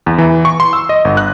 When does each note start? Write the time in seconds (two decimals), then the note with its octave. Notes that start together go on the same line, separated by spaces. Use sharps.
0.06 E2
0.18 E3
0.45 C#6
0.60 C6
0.73 E6
0.89 D#5
1.05 G1
1.17 F#6